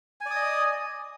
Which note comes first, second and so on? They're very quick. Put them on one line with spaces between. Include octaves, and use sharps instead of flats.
G#5 D5 D#6 D#5